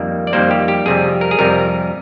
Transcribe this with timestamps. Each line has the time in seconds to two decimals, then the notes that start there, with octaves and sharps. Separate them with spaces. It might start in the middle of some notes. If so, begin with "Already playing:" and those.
Already playing: F2 D#3 G3 A#3
0.27 D5
0.33 F2 D#3 G3 A#3 C5
0.51 G4
0.68 G4
0.86 F2 C3 G3 G#4
1.21 A#4
1.31 G#4
1.39 F2 C3 G3 A#4